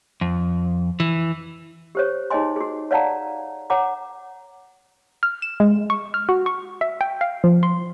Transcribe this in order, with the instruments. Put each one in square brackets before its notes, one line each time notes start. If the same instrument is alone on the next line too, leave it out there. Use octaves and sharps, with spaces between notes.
[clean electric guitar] F2
E3
[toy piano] G4 C5 C#5
D#4 G#4 C#5 D#5 G#5 C6
F#4 G#4
C#5 D5 F5 F#5 A5 A#5
C#5 F#5 A#5 D6
[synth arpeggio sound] F6
E7
G#3
C#6
F6
F#4
C#6
E5
G5
F5
F3
C6